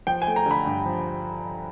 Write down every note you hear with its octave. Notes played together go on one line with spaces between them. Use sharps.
F3 G5
G#5
A3
A#5
D3 B5
G2
F3